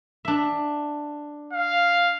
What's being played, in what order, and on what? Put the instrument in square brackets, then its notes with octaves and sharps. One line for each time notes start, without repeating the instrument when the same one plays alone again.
[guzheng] D4 E5
[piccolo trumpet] F5